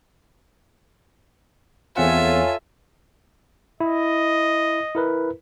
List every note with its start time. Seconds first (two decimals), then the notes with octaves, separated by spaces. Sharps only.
1.97 E2 C4 F4 A4 C#5 E5 F#5 G#5
3.80 E4 D#5
4.95 E4 A#4 B4